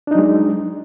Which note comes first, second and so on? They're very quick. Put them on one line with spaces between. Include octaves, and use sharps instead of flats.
D4 D#4 F#3 G#3